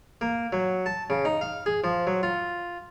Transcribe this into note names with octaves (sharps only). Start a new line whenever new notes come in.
A#3
F#3
A5
C#3
D#4
F5
G#4
F3
F#3
F4